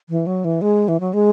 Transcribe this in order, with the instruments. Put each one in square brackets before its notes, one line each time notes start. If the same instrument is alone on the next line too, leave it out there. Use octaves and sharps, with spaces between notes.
[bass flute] E3
F#3
E3
G#3
E3
F#3
G#3